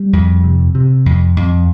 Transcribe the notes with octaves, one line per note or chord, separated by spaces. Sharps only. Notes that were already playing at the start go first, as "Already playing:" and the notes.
Already playing: G3
F2
C3
C3
F2
F2